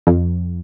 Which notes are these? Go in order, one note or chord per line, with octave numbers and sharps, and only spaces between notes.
F2